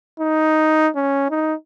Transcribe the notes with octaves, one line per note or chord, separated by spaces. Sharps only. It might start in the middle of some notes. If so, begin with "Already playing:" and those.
D#4
C#4
D#4